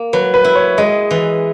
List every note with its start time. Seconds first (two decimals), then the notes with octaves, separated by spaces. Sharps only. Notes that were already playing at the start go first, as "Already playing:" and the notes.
Already playing: A#3
0.13 F#3 B4
0.34 B4
0.44 E4
0.55 C#5
0.78 G#3 D#5
1.11 E3